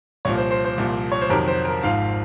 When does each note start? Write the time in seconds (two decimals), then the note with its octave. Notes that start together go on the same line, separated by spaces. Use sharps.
0.25 C2 A#2 F3 C#5
0.38 C5
0.51 C5
0.65 C5
0.78 C2 A#2 F3
1.12 C#5
1.21 C5
1.30 F2 C3 D#3 F#3 A#4
1.48 C5
1.65 A#4
1.82 G#1 G#2 F3 F5